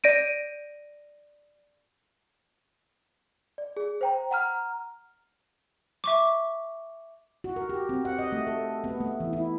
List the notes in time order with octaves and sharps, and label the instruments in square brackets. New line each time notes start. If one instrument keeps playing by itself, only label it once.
[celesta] D5 A#6 D7 D#7
D5
G#4
C5 G5 A#5
F#5 A#5 F6
[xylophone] E5 C#6 D6
[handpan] F#4
A#4
G4
C4
F#5
D#5
A3
A4
B3
A3
E3
E4